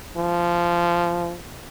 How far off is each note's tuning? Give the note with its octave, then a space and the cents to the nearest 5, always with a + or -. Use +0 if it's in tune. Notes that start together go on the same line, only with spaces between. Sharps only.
F3 -15